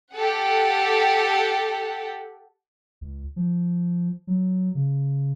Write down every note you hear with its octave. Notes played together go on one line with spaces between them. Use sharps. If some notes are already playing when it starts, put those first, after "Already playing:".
G4 A4 F#5
C#2
F3
F#3
C#3